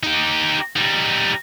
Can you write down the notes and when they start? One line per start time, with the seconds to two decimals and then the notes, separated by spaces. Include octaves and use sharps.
0.03 D#4 G4
0.76 G3 D#4